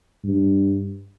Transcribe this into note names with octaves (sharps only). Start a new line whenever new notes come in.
G2